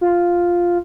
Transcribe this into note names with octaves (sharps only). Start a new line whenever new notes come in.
F4